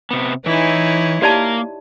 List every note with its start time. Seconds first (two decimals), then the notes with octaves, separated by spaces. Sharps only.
0.11 C3 B3
0.46 E3 D#4 E4 C#5
1.22 A#3 G4 D5 F5 A5 A#5